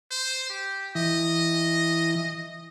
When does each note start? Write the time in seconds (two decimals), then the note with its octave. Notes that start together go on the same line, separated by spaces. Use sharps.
0.11 C5
0.50 G4
0.95 E3 D#5